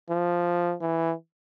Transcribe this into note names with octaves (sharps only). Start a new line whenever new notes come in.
F3
E3